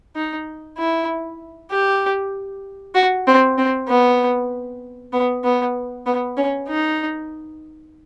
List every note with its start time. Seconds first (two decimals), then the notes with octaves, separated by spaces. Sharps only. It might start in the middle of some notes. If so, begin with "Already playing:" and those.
0.16 D#4
0.78 E4
1.71 G4
2.95 F#4
3.27 C4
3.58 C4
3.89 B3
5.13 B3
5.44 B3
6.06 B3
6.37 C#4
6.68 D#4